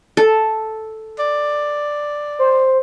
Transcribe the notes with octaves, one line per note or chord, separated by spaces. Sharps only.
A4
D5
C5